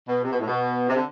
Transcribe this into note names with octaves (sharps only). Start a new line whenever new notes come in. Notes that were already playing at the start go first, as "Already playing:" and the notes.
B2
C3
B2
A2
B2
C3
D3